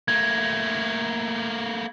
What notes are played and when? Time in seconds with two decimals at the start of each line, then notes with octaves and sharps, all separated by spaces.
0.08 A3 A#3 G#6